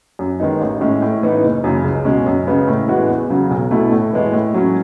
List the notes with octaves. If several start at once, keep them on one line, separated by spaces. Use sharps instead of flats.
F#2
D#3 G#3 B3 D#4
A1
A2 G#3 C#4
A2
E3 B3 D#4
F#1
F#2 C#3
C#2
B2 G#3 C#4
F#2
C#3 G#3 B3
A2
E3 G#3 B3 F#4
E2
C#3 F#3
B1
B2 A3 E4
A2
E3 G#3 B3
A2
F#3 C#4